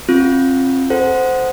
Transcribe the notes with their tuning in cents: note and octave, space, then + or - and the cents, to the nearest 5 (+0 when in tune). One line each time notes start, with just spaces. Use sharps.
C4 +30 F4 +0
A4 +0 C5 -15 F#5 +0